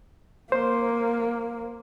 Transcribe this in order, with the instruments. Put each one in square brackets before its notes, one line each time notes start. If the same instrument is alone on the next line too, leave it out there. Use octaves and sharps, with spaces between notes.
[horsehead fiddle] A#3 [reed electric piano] C5 C6